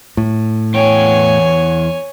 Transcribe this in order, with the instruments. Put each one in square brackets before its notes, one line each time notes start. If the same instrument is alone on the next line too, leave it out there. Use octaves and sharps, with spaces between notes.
[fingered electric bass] A2
[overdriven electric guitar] E2 G5 [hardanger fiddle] C#5 G#5